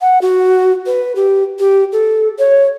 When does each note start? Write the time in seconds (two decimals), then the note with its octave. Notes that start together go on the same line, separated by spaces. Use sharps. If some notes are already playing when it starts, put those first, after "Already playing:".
0.01 F#5
0.22 F#4
0.87 B4
1.16 G4
1.59 G4
1.92 A4
2.39 C#5